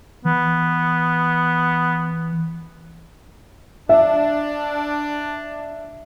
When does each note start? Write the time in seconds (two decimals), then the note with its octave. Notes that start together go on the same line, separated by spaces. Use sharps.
0.25 E3 B3
3.89 D4 E5